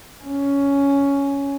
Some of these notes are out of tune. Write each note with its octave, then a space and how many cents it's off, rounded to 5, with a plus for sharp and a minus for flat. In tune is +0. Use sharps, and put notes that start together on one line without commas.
C#4 +10